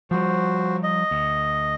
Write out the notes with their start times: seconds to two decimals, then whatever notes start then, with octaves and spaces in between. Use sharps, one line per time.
0.11 F3 G3 F#4 C5
0.83 D#5
1.11 D2